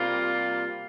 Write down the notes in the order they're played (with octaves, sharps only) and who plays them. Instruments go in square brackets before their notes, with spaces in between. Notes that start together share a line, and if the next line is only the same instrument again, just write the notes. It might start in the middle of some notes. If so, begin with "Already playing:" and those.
Already playing: [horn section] C3 G3 A#3 F4